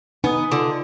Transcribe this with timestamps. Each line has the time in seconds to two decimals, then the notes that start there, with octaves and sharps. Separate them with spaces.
0.24 B3 D#4 G#5 D#6
0.52 D3 F4